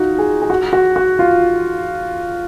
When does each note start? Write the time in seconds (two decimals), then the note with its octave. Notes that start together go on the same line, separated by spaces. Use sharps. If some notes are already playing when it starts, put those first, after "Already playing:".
Already playing: D#4 F4 F#4
0.18 G#4
0.42 G#4
0.50 F#4
0.73 F#4
0.96 F#4
1.19 F4